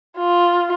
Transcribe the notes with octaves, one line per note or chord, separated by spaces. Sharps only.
F4